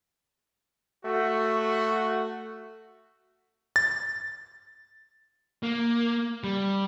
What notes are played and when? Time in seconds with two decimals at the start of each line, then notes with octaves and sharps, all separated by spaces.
1.05 A3 F#4
3.76 A6
5.63 A#3
6.44 G3